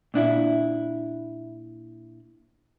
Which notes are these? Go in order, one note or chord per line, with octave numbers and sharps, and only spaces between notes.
A#2 D4 E4